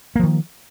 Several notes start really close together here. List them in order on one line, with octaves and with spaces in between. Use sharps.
A#3 F3 D#3